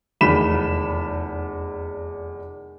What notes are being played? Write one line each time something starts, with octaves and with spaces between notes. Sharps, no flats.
F1 E2 D#3 B5 B6 E7